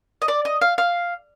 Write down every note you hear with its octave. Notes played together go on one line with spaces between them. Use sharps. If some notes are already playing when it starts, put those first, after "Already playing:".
D#5
D5
D#5
F5
F5